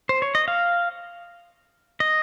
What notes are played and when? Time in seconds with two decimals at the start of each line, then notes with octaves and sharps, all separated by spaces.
0.09 C5
0.22 C#5
0.35 D#5
0.48 F5
2.00 D#5